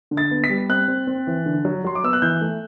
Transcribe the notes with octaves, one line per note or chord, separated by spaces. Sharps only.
D3
A6
B3
B6
G3
C4 F#6
C4
C4
E3
D3
F#3
F#3 C6
D6
B3 E6
F#6
E3 G6
A3